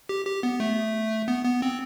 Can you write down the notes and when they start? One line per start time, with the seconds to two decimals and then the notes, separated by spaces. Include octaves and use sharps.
0.09 G4
0.26 G4
0.43 B3
0.60 A3
1.28 B3
1.45 B3
1.62 C4